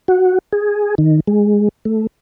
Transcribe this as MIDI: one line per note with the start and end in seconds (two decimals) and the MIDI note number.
0.08 0.38 66
0.53 0.95 68
0.98 1.20 51
1.27 1.69 56
1.85 2.07 57